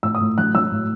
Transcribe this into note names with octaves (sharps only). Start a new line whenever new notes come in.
A2 E6
D#6
A2
F#3 F#6
F#3 E6
A2